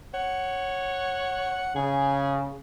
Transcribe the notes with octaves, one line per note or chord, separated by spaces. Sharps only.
C#5 F#5
C#3 G#4